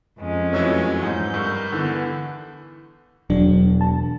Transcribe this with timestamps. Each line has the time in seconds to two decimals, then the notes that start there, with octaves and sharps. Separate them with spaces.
0.19 F2 G#3 C#4
0.53 E3 F#3 A3 C#5 E6 G#6
1.02 G#2 E3 G6
1.34 G2 A#4 C#6 E6
1.72 D3 E3 B3
3.30 E1 F#3 D4
3.81 A5